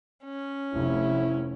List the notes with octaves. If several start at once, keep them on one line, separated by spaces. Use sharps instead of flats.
C#4
F1 E4